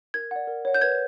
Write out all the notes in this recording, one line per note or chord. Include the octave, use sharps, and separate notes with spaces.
A#4 G#6
D5 F#5
A#4
C#5 F#5
G6
B4 G#6